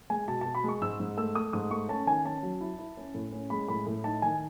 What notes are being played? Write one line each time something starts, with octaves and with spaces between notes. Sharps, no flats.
G#3 G#5
B2 A5
B2 A5
B5
G#3 C#6
G#2 E6
G#2
A3 E6
A3 D#6
G#2 D#6
A3 C#6
C#4 A5
D#3 G#5
C#4 A5
F#3
E4
E4
C#4
A2
C#4
G#3 B5
A2 B5
A2
D#4 A5
D#3 G#5